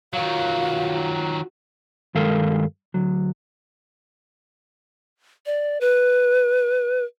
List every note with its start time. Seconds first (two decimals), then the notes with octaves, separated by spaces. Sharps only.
0.13 D#3 F#3 F4 F#4 F5
2.15 G2 D#3 G#3 A4 A#4 F5
2.94 D2 F#3
5.46 D5
5.81 B4